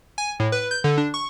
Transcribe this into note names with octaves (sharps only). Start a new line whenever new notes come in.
G#5
A2
B4
G6
D3
D4
C#6